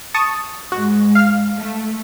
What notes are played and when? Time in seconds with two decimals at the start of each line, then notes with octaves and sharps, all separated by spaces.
0.14 A5 C#6 D#6
0.72 G#2 G#3 F#4
1.15 F5 F6
1.57 A3